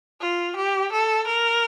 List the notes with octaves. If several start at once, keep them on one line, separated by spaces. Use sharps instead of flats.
F4
G4
A4
A#4